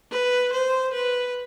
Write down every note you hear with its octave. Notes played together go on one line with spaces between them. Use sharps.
B4
C5
B4